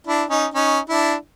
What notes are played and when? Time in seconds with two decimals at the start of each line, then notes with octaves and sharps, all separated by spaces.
0.07 D4 E4
0.30 C#4 D#4
0.54 C#4 D#4
0.89 D4 E4